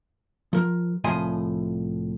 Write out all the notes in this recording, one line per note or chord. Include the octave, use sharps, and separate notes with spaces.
F3 A#4
C2 A2 F3 D#5 G#5 C6